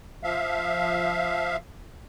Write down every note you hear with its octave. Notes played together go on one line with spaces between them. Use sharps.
F3 E5 F5